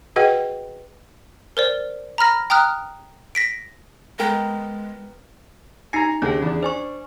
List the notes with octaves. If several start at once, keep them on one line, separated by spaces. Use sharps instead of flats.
F#4 G#4 B4 D#5 F#5 G5
A#4 C5 D5
A#5 B5 F6 A#6
G5 A#5 D#6 F6 F#6
A#6 B6 D7
G#3 B3 A#4 G5
D#4 G#5 A#5 A#6 C#7
D#2 D3 C#4 G#4
E2 D4
D4 C5 G#5 C#6